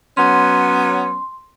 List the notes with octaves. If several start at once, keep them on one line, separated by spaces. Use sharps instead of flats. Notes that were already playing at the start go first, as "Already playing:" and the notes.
F#3 B3 C#4 C6